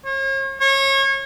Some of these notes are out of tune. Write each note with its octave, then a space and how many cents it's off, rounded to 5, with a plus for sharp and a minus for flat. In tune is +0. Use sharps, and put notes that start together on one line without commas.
C#5 -40
C#5 -30